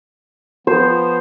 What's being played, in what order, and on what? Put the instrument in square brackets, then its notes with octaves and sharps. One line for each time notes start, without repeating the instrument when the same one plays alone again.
[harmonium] F3 B3 [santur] C5